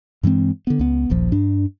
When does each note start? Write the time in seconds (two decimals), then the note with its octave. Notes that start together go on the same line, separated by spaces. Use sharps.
0.23 G2 E3 G#3 C4
0.67 D3 B3
0.79 C#2 B3
1.10 D#1 A#1 F3
1.32 G2 D4